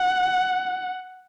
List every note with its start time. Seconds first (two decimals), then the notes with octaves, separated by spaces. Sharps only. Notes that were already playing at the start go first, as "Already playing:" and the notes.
Already playing: F#5